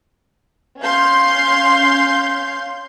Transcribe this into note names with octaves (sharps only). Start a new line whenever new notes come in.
C#4 F5 C6 G6